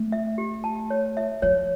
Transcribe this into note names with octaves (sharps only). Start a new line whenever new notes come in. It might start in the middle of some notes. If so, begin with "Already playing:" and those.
Already playing: A3
E5
G4
A5
C#5
E5
F3 C#5